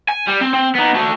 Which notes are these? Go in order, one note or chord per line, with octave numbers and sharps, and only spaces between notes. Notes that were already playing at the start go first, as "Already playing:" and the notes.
G#5
G3
C4
C4
B3 D#4
A3 F#4